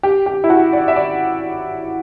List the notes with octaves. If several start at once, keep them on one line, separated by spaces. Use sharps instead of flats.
G4
G4
E4
F#4
D5
E5
D5